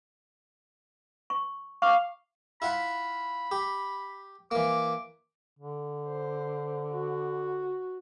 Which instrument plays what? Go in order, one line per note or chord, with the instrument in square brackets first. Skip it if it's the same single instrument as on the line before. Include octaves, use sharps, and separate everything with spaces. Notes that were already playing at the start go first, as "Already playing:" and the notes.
[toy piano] C#6
[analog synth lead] F5 [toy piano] C#6 D6
[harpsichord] E4 F4 F#5 [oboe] B5
[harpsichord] G4
[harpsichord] E3 A#3 [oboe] D6
[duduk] D3
[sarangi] C5
F#4